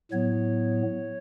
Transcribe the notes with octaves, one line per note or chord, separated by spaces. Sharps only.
A2 F#3 B3 C#5